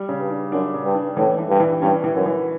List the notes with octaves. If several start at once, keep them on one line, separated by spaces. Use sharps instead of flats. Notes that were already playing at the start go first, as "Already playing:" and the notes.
Already playing: G3
C#3
G2
D4
F#2 D4
C#3
G2
D4
A2 E3
E3
G2
E3
G2 C#4
E3
F#2
E3